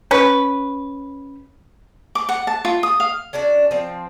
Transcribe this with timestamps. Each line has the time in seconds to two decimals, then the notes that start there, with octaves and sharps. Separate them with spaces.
0.11 C#4 B4
2.15 D6
2.29 F#5
2.47 A5
2.65 F4
2.83 D#6
3.00 F5
3.33 C#4 D4 F#4 D5
3.71 F3 C4